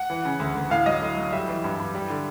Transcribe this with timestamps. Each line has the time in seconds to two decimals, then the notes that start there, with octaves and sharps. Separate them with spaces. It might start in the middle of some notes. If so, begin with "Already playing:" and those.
Already playing: F#5
0.10 E3
0.25 C#3
0.40 D2
0.55 D2
0.70 A2 F5
0.86 F#3 D#5
1.02 A2
1.17 F#3
1.33 G3 E5
1.48 E3
1.64 G2
1.79 G2
1.95 G3
2.10 D3